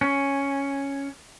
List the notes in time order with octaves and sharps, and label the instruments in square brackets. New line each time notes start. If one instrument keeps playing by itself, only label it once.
[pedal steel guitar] C#4